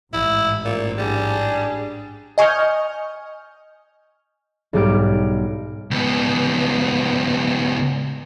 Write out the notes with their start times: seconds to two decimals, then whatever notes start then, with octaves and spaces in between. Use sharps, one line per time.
0.13 A1 G#2 E4
0.65 A#2
0.98 G3 D4 G#4
2.38 D#5 G#5 C#6 F6 G6
4.73 B1 G#2 G3 G4 F6 D7
5.91 C#2 B3